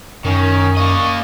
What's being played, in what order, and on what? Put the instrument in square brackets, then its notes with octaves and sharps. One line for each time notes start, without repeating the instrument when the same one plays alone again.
[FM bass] F#2 [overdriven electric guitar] D#3 [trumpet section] C#4
[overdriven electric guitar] A#3 D#5 [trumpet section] D5 F5 C#6